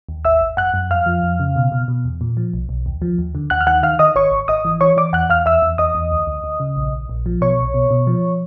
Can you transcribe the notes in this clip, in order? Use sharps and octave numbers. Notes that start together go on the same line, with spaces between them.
D#2
G#1 E5 E6
G#1
F#2 F#5 F#6
F#2
F2 F5 F6
F3
F2
C#3
B2
B2
B2
E2
A#2
F3
B1
B1
D#2
F3
D#2
D3
D#2 F#5 F#6
F6
D#3 F#5 F#6
D#3 F5 F6
D#3 D#5 D#6
G#1 C#5 C#6
G#1
G#1 D#5 D#6
E3
E3 C#5 C#6
E3 D5 D6
E2 F#5 F#6
E2 F5 F6
E2 E5 E6
E2
E2 D#5 D#6
E2
D2
D2
D2
C#3
A#1
A#1
A#1
F3
B2 C#5 C#6
B1
B2
B2
F3